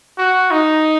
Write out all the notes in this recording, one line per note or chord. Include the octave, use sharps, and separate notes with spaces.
F#4
D#4